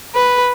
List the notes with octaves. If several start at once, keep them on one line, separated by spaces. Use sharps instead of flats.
B4